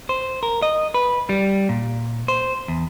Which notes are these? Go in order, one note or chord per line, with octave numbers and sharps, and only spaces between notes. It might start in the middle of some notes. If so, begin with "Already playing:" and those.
C5
A#4
D#5
B4
G3
A#2
C5
E2